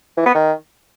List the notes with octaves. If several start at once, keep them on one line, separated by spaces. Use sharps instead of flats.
E3
B3
D#3